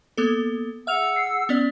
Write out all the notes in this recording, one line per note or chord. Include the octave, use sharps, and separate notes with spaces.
A#3 B3 A4
G#4 E5 F#5 E6 F6 F7
C7
B3 C#4 D5